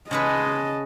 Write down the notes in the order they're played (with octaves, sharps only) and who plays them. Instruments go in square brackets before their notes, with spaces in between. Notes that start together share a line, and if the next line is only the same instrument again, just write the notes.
[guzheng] C#3 C#4 B4 [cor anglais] G#3 [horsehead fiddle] D#5 A5